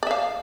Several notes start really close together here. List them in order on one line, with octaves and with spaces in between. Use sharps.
D5 E5 F5